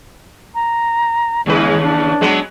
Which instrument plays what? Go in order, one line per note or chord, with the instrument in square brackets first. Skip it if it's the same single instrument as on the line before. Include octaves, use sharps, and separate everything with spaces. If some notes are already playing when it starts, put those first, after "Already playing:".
[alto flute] A#5
[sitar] D#2 C#3 B4 [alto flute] G#3
[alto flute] D4
[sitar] F#3 G#3 B3